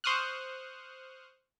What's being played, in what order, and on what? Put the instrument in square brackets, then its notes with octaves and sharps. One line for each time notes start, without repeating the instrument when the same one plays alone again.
[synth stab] C5 C#6 D#6 F6 F#6